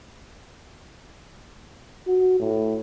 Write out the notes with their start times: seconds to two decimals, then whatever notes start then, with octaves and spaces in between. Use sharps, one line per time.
2.07 F#4
2.40 A2